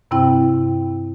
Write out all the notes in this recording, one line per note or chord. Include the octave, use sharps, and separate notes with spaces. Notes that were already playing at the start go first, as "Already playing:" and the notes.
G2 C3 C4 E4 G5